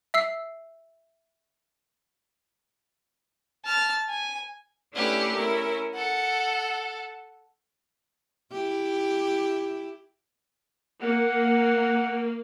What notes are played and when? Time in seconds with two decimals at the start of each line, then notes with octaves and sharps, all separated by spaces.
0.14 E5 E6 C7
3.65 A5 F6
4.09 G#5
4.94 A3 C#4 D4 E4 G4 B4
5.36 C#4 E4 A#4
5.95 A4 F#5
8.52 E4 G4
11.02 A#3 F#5